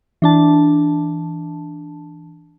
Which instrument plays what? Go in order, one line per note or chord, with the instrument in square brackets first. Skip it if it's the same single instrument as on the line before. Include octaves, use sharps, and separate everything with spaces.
[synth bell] E3 D4 A5